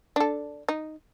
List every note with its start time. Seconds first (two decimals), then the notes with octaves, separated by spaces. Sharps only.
0.16 D4 A4
0.69 D#4